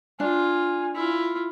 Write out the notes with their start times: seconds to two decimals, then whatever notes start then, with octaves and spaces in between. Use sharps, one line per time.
0.20 D4 F4 G#5
0.95 E4 F4